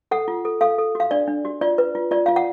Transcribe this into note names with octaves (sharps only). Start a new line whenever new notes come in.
A4 F#5
F4
A4
A4 F5
A4
F#4 F5
D4 D5
D4
F#4
F4 D5
B4
F4
F4 D5
F4 F5
F#5